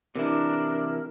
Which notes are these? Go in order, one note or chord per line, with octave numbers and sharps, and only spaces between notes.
C3 E3 D4 E4 A#4